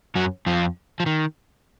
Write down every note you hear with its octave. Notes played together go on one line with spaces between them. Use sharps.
F#2 F#3
F2 F3
F3
D#3